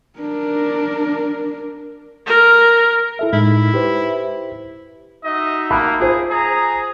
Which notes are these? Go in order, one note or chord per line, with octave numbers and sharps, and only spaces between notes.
D4 A#4
A#4
E4 A4 E5
A2 G#3 D#4 E4
G4 B4 C5
D#4 F#4 D#5 E5
A#3 A5 B5 F#6
F4 G#4 C5
G#4 A#5